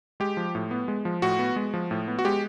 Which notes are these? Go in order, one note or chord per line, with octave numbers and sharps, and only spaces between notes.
G#3 G4
F3
A2
B3
G#3
F3
A2 F#4
B3
G#3
F3
A2
B3
F#4
G#3 G4